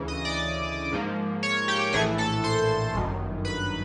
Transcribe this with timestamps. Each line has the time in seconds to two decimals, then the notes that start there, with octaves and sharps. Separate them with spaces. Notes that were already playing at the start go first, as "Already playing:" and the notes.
Already playing: D2 C#3 E3
0.08 D#5 D#6
0.25 D5 D6
0.92 G#2 F3 A#3
1.43 C#5 C#6
1.68 G4 G5
1.93 A#1 A2 E3 A3 G#4 G#5
2.18 A4 A5
2.44 C5 C6
2.94 G1 F#2 D#3
3.45 B4 B5